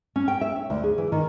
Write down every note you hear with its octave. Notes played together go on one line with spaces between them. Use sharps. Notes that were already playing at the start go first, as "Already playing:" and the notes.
C#4
G5
E5
C#5
D2
G#4
E3
D#3